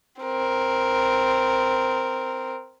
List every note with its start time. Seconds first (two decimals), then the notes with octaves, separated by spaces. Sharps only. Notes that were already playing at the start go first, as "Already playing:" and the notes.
0.22 C4 A#4